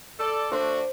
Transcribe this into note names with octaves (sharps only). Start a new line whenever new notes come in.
A4 D5
A3 D4 F#4 C5